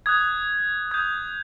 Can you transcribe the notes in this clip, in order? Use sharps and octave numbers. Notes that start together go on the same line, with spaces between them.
D#6 F#6 G#6
D#6 G6 G#6